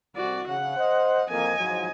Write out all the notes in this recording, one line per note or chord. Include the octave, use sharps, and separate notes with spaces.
C2 F#4 D5
C#3 F#5
C5 D#5
F2 A#3 D#5 G#5
G#2 F3 F#3